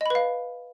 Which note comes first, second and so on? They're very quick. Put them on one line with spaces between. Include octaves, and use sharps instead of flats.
D#5 B5 B4 F5